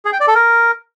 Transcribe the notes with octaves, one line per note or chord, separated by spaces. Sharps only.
G#4
G5
D5
A4
A#4